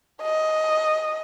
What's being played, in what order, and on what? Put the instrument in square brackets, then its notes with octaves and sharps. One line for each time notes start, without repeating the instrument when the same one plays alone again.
[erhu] D#5